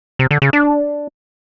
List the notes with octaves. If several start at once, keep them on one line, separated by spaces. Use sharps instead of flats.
C3
D3
C#3
D4